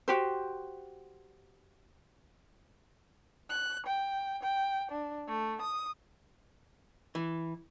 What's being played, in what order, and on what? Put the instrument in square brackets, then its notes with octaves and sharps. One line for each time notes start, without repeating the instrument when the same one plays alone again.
[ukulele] F#4 G4 C5
[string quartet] F#6
G5
G5
D4
A3
D#6
[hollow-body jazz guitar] E3